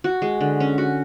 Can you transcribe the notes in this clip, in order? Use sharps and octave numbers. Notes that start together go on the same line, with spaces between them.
F#4
G#3
D3
C#4
F#4